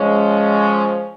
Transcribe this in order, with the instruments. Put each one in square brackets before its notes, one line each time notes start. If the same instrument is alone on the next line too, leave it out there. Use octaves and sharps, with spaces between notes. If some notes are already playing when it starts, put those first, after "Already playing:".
Already playing: [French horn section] F3 G#3 C#4